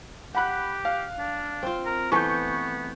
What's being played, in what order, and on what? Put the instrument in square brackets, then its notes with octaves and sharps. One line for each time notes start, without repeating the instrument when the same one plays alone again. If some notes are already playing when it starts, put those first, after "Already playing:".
[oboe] G4 [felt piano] F#5 B5 F#6
[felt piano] F5
[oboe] D4
[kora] C4 F4
[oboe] A#4
[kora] E3 A3 [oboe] B3 [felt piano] C#6 G6